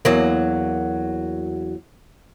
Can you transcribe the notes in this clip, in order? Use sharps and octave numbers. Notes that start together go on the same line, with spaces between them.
E2 F#3 A#3